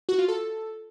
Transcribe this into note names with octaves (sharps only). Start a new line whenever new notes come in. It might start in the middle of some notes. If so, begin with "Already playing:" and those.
F#4
F4
A4